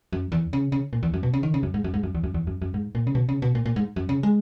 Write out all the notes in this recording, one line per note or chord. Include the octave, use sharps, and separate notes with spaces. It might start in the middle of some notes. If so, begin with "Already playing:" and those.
F#2
E2
C#3
C#3
A#2
E2
F#2
B2
C#3
D#3
C#3
F#2
G#2
F#2
G#2
F#2
E2
F#2
E2
F#2
F#2
G#2
A#2
C#3
B2
C#3
B2
A#2
A#2
G#2
F#2
C#3
G#3